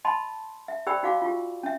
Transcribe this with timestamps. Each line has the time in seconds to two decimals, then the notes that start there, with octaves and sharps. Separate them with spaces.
0.05 D#5 A5 B5 C6
0.68 E5
0.87 G4 C5 D5 G5 B5 E6
1.03 D#4 F#4 F5 D6
1.22 F4 G4
1.63 C#4 E5